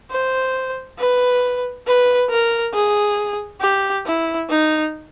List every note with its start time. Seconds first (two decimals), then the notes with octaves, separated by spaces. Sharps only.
0.11 C5
0.98 B4
1.87 B4
2.30 A#4
2.74 G#4
3.61 G4
4.06 E4
4.50 D#4